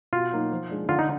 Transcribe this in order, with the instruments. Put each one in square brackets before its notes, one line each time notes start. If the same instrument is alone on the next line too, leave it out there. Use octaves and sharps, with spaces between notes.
[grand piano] B2 [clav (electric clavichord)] F4
[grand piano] F#3 A#3 D#4
F3
G#3 D4
[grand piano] D3 [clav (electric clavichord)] F4
[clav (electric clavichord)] D#4